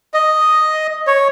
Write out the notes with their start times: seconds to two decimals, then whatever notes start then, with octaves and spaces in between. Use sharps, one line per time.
0.14 D#5
1.07 C#5